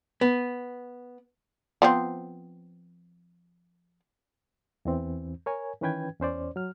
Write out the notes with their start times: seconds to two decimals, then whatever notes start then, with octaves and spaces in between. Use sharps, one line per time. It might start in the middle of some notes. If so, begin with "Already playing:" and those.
0.21 B3
1.82 F3 B3 C4
4.85 E2 E3 C4
5.46 A#4 C#5 G#5
5.81 D#3 E3 C#4 B4 G5 G#6
6.20 E2 C#4 C5 D5
6.56 F#3 F6